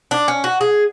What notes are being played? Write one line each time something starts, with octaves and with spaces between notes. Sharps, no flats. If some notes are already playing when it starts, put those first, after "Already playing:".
D4
C#4
F#4
G#4